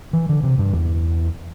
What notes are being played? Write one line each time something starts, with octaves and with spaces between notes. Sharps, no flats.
E3
D3
C3
G2
E2